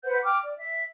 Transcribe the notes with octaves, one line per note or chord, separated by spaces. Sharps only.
B4 C5 F#5 G6
G5 D6 F6
D5
E5